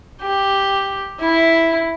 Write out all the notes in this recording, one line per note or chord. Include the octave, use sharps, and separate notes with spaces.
G4
E4